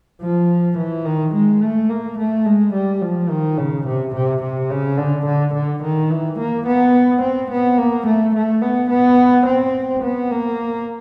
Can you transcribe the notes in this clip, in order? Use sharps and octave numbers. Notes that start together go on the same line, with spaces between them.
F3
E3
D#3
G#3
A3
A#3
A3
G#3
G3
F3
D#3
C#3
C3
C3
C3
C#3
D3
D3
D3
D#3
E3
A#3
B3
C4
B3
A#3
A3
A3
B3
B3
C4
B3
A#3